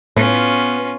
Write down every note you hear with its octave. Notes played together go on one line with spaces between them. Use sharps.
A2 B3 C#4 F4